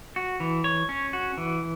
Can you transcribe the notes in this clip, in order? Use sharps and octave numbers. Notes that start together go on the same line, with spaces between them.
F#4
E3
C#5
C#4
F#4
E3